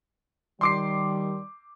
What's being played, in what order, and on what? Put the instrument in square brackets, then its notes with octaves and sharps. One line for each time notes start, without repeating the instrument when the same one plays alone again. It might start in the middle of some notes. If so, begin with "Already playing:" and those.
[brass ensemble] D#3 G3 [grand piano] C6 D6 C7